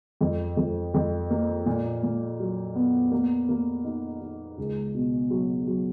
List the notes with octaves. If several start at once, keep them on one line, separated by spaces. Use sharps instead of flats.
F2
F2
F2
A#3
A#2
A#2
F#3
B3
A#3
A#3
D#4
D#4
C#2
B2
F#3
F#3